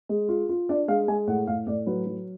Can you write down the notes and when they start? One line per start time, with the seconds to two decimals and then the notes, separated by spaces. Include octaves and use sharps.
0.09 G#3
0.29 F4
0.49 F4
0.69 D4 D5
0.88 G#3 F5
1.08 G#3 G#5
1.27 A2 F#5
1.47 A2 F5
1.67 A2 D5
1.87 F#3 B4
2.07 F#3